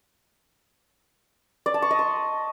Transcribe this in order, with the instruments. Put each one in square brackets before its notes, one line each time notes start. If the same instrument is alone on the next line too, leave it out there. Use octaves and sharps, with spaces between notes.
[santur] D5
A5
C#6
D#5
C6